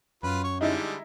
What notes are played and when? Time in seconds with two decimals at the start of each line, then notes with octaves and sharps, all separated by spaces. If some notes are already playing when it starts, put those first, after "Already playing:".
0.23 F#2 F4 B4
0.44 C#5
0.61 D3 G3 G#3 D#4 E4